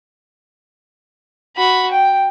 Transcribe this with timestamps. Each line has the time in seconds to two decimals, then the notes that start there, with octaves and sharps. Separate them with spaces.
1.56 F#4 B5
1.91 G5